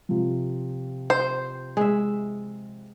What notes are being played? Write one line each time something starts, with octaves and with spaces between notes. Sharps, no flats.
C3 F3
C5
G#3 E5